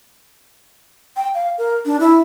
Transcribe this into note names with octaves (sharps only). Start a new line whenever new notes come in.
G5
F5
A#4
D4
E4